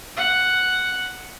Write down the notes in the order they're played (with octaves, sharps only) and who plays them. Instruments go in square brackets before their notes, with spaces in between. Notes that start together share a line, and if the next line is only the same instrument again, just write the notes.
[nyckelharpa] F#5